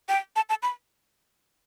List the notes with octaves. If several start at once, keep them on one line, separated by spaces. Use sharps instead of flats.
G5
A5
A5
B5